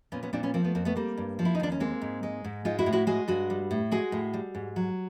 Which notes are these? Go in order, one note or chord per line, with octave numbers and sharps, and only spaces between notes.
A#2 B3 C#4
B3 C#4
A#2 C4 D4
B3 C#4
F3 A#3 C4
A3 B3
F2 A#3 C4
A3 B3
G3 A#3 C4
G2
F3
E4
D#4
D#2 D4
C#4
G#3 A#3 C4
G#2
G#3
G#2
G#3 D#4 F4
E4 F#4
A2
E4 F#4
G#3 F#4 G#4
G2 F#4 G#4
G3
A2
G#3 F#4 G#4
A2
G3
G#2
F#3